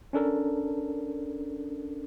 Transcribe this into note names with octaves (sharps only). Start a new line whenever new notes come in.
C#4 D4 A4 A#4